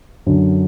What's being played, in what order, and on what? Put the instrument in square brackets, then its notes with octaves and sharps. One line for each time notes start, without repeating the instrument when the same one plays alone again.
[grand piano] F#2 D3